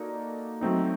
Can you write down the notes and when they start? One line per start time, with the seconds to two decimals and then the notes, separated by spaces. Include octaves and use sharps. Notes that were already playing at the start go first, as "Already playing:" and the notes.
Already playing: A#3 D#4 F#4 A4 D5
0.61 F#3 A3 C4 D#4